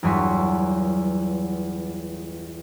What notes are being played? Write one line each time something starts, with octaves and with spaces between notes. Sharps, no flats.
G1 E2 F#3 C#5 C6 B6